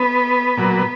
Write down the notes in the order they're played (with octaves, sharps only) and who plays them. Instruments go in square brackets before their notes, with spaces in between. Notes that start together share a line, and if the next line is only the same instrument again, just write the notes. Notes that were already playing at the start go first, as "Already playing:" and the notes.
Already playing: [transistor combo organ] B3
A#2 F#3